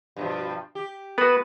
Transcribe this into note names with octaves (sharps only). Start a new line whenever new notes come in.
G2 B2 F3
G4
B3 F#4 B4